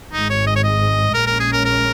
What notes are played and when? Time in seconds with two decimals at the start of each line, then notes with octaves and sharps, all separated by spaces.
0.12 G#1 G#2 G#3 D#4
0.30 C#5
0.47 D#5
0.56 C#5
0.64 D#5
1.14 A#1 A#2 G#3 C#4 A#4
1.27 A#4
1.39 G#4
1.53 A#4
1.65 A#4